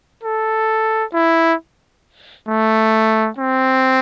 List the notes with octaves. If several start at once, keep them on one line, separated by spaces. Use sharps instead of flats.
A4
E4
A3
C4